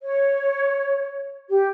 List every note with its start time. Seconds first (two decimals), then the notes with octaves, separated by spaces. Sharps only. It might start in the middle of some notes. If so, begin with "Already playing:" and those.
0.02 C#5
1.49 G4